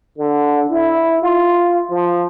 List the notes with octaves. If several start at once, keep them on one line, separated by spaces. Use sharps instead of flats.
D3
E4
F4
F3